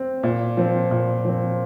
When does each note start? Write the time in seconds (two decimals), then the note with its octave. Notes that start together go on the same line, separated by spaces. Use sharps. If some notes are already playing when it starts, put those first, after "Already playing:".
Already playing: C4
0.23 A#2
0.57 F3 C4
0.91 A#2
1.25 F3 C4